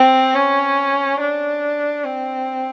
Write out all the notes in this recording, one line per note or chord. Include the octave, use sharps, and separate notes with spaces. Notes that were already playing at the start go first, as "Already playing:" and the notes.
Already playing: C4
C#4
D4
C4